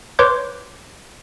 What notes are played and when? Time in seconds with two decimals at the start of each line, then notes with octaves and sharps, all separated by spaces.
0.19 B4 C#5 C6 D6 G6